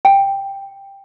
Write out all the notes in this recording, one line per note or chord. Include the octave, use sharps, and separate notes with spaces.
G5